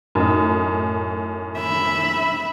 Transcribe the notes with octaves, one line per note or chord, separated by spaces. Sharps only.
F#2 A2 D#4
E5 B5